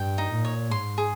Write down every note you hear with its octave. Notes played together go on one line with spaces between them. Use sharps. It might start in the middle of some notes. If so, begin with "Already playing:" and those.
Already playing: G2 G5
D#4
A#2
C#5
G#2 C6
G#4